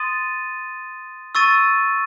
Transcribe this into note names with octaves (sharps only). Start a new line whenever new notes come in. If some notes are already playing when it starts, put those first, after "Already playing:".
Already playing: C6 D#6 A6 D#7
C#6 E6 A6 D#7